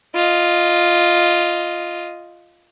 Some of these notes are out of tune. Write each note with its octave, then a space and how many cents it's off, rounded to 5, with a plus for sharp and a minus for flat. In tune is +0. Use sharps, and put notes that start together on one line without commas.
F4 +0 D#5 +0